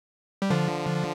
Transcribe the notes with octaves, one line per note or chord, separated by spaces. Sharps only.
G3
D3 F3